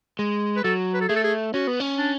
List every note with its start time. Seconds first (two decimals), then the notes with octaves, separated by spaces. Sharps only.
0.19 G#3
0.56 B4
0.64 F#3 A4
0.94 B4
1.01 A4
1.08 A3 G#4
1.16 A4
1.24 G#4
1.54 C#4 F#4
1.67 B3
1.80 C#4
1.98 D4